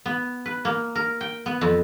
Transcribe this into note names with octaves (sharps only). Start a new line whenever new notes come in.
B3
B4
A#3
A#4
G5
B3
F2